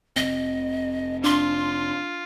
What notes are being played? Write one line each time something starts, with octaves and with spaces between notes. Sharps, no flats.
F1 C3 C4 D#5
D4 F4 C6